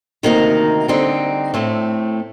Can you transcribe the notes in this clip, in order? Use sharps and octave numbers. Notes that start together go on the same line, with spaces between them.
D2 C3 D#3 A#3 D#4
D3 G3 C4 D#4
A2 A3 C4